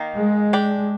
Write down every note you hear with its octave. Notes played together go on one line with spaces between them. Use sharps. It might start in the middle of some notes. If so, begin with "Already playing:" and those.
Already playing: D#3 A#3 D#4
G#3
D4 G4 D5